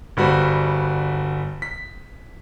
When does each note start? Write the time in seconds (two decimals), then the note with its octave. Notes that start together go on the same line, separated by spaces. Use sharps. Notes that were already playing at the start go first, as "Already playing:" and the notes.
0.17 G1 G3 F#4 B4 C5 B5
1.62 B6